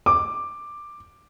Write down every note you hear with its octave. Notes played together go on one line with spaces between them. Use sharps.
D6